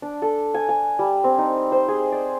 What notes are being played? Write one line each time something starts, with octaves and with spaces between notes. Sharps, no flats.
D4
A4
G#5
G#5
G3
C4
D#4
C5
G#4
D5